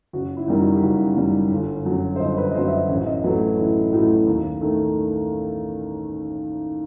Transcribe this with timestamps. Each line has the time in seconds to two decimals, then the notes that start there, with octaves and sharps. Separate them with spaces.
0.13 F#1 F#4
0.37 E4
0.48 F#2 D#3 G3
0.60 F#4
0.74 G4
0.82 F#1 F#4
1.17 F#2 D#3 G3
1.51 G1
1.85 F#2 F#3
2.16 C5
2.20 G1 D#5
2.37 B4
2.51 D#5
2.54 F#2 C5
2.58 F#3
2.68 E5
2.72 D#5
2.89 A1
3.06 D#5
3.24 A2 F#3 A3 B4
3.58 A1 E4
3.93 A2 F#3 A3
4.27 D#2
4.61 D#3 A3